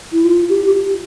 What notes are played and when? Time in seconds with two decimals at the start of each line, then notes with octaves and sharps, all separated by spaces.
0.12 E4
0.24 F4
0.49 G4